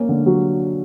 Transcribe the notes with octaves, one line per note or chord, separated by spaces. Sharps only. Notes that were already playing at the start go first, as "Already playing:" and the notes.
Already playing: A#3 C#4
D3
F#3